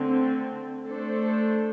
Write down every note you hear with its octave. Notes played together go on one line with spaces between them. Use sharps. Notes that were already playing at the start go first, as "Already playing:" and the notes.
Already playing: D3 A3 C4
A3 D4 A4 C5